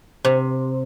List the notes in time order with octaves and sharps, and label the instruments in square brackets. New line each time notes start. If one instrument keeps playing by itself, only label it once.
[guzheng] C3